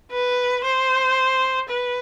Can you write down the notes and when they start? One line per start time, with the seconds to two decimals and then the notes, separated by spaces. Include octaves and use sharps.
0.11 B4
0.64 C5
1.69 B4